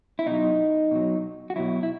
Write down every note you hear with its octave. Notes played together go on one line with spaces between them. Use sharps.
E4
B2 F#3 D#4
B2 F#3
F#4
B2 F#3 E4
E4